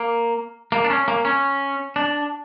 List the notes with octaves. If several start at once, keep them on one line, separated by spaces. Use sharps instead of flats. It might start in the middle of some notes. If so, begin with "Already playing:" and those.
Already playing: A#3
A#3
D4
C#4
A#3
C#4
D4